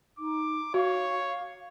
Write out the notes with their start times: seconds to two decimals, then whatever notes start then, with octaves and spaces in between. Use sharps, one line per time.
0.19 D#4 D6
0.74 F#4 C#5 F5